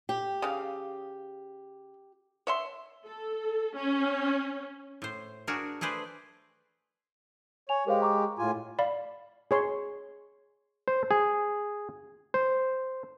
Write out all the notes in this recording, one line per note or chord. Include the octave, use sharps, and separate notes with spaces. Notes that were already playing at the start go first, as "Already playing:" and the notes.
G4
C#3 F5
C#5 E5 C6
A4
C#4
A2 C5
D4 F#4 G#4 A#4
A3 G#4 B4 C5 D5
C#5 G#5 F7
G#3 G4 A#4 C5 F5
A#5 C#6 D6
A2 F4 G#5
D5 F5 B5
G#4 C#5 C6
C5
G#4
C5